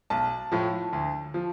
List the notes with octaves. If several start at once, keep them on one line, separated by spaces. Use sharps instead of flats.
B1 A5
A2 F3
D2
F3